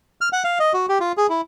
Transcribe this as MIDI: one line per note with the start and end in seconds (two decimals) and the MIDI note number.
0.21 0.29 89
0.33 0.43 78
0.44 0.58 77
0.59 0.73 75
0.73 0.86 66
0.89 0.98 67
1.00 1.12 65
1.17 1.27 68
1.30 1.41 64